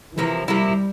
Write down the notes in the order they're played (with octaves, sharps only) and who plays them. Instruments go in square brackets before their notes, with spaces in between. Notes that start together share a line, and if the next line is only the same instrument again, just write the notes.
[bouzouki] C3 F3 A#3 E4 [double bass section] E3
[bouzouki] C3 F3 A#3 E4 [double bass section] G3